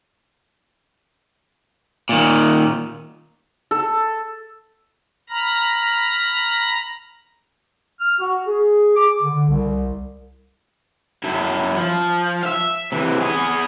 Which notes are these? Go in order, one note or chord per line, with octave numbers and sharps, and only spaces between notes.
A#2 D#3
A4
A#5 B5 F6 A#6
F6
F#4
G#4
D6
D3
C2
F#2 E4
F3
E5 F5
C3 E3
B3 G#4